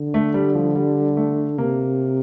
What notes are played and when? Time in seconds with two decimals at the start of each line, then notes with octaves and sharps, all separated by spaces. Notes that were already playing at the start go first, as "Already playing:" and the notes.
Already playing: D3
0.14 A3
0.34 G3
0.55 F3
0.75 G3
1.17 A3
1.58 C3 A#3